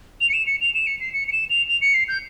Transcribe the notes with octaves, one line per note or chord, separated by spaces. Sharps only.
F7
C#7
E7
C#7
F7
E7
C#7
C7
C#7
C#7
E7
F7
F7
C#7
C7
G6